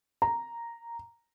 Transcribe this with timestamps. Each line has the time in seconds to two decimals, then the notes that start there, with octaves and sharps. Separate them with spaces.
0.22 A#5